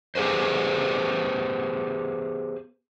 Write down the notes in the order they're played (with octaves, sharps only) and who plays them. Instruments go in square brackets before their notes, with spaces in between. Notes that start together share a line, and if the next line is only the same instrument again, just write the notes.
[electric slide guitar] B3 G4 G#4 B4 C5